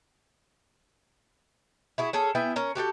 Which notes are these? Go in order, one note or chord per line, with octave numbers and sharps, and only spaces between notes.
E4 F#4 G#4
C#4 G#4 A4
B3 E4 G#4 G5
C#4 A#4
F#4 G4 A4 G5